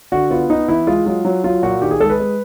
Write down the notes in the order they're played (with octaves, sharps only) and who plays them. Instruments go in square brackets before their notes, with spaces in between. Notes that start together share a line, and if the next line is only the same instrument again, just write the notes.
[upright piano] D3 [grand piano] F#4
[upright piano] B3 [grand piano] F4
[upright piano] B3 [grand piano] D#4
[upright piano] E3 [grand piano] E4
[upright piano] G#3 [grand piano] F4
[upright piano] F#3 [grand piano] F4
[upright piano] F#3
[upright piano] F#3 [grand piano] F4
[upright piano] A#2 [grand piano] F#4
[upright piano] D#3 [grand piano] G4
[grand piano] G#4
[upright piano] G#3 [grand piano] A4
[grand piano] B4
[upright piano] G#3